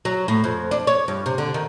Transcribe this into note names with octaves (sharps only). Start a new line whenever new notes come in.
F#3
A2
F2
D4
C#5
G2
C3
D3
D#3